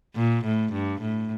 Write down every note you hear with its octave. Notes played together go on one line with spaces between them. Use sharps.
A#2
A2
G2
A2